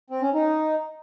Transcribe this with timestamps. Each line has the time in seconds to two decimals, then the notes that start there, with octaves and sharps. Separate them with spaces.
0.10 C4
0.22 C#4
0.34 D#4